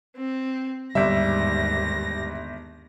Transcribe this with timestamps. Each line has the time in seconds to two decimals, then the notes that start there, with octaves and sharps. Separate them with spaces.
0.16 C4
0.95 G1 D#2 G#2 G3 E5 A#6